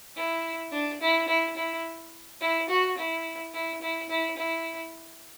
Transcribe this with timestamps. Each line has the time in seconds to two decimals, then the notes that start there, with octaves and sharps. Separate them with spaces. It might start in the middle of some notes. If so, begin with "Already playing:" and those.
0.16 E4
0.72 D4
1.00 E4
1.28 E4
1.56 E4
2.40 E4
2.69 F#4
2.97 E4
3.53 E4
3.81 E4
4.09 E4
4.37 E4